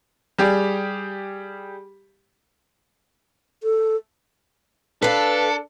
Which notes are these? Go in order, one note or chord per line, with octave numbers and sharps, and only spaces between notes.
G3 G4 G#4
A4
D4 A4 B4 F5